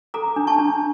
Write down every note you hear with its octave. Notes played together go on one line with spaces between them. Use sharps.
A4 A#5 D6
D4
A5 C#6
D4